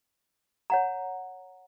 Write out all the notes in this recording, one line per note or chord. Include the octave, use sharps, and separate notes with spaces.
C#5 F#5 A#5